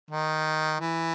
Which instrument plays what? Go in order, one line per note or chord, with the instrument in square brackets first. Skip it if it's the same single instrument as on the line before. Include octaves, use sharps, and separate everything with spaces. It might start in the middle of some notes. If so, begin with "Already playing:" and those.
[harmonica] D#3
E3